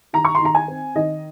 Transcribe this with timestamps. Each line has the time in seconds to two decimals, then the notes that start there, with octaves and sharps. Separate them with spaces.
0.13 D#3 A#5
0.25 C#6
0.35 C6
0.41 D#3 A#5
0.55 G#5
0.68 C4
0.96 D#3 D#5